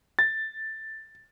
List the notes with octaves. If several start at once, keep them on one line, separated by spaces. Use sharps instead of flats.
A6